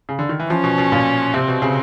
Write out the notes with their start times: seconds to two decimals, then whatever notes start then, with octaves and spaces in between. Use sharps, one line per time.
0.09 C#3
0.19 D3
0.29 D#3
0.39 E3
0.50 F3 C#4
0.64 B2
0.78 B2
0.92 A#2
1.34 C3 C4
1.48 B2
1.62 C#3